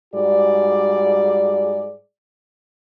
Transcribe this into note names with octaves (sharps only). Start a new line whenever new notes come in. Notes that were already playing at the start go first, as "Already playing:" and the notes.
G#2 G3 F#4 G#4 D5